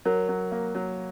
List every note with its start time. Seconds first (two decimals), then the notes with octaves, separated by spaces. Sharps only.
0.05 F#3 A#4
0.29 F#3
0.52 A#3
0.75 F#3